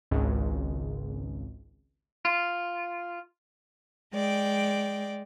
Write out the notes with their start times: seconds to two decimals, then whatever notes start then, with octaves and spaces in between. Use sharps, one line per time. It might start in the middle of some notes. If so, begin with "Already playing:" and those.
0.11 G#1 C#2
2.25 F4
4.13 G#3 D5 G5